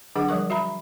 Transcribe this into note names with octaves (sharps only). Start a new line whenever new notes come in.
D3 F#3 D4 G#4 F#5 D6
F3 G3 A#4 C#6
F#4 E5 A#5 B5